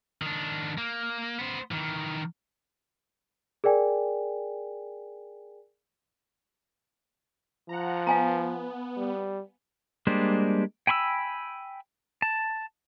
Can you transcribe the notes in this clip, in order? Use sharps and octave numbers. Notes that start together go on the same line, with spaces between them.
D#3 D4
A#3
B3 C5
D#3 E3
G#4 A#4 D5 G5 G#5
F3 F#5 A#5
B3 F5 G#5 A#5
G3
G3 G#3 A#3 D4 C5
G5 G#5 B5 C6 E6
A5